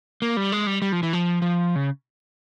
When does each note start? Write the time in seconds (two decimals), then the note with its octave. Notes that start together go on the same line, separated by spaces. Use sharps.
0.22 A#3
0.37 G3
0.52 G#3
0.67 G3
0.82 G3
0.92 F3
1.03 E3
1.13 F3
1.42 F3
1.76 C#3